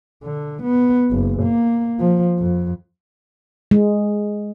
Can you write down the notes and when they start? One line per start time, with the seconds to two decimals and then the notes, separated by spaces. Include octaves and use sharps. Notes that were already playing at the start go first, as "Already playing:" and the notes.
0.24 D3
0.63 B3
1.11 F#1
1.43 A#3
2.00 F3
2.39 F2
3.71 G#3